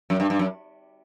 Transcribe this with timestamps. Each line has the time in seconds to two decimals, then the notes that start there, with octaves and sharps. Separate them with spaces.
0.10 F#2
0.20 G2
0.30 G2
0.39 F#2